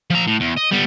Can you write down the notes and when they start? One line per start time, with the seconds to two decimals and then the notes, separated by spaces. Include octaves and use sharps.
0.10 F3 A#5
0.27 A2
0.40 E2
0.57 D#5
0.71 G3 B3